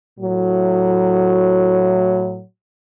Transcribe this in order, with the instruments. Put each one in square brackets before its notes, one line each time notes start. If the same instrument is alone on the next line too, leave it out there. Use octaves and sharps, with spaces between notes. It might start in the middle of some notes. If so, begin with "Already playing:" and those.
[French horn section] A2 F#3